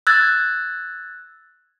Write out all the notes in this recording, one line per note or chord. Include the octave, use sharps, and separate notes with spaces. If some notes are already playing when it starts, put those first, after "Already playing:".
E6 F#6 G#6 A6